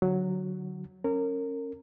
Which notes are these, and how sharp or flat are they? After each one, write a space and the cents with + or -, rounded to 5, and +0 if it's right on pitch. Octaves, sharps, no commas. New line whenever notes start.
D3 +0 F#3 +0
C#4 -20 A#4 -25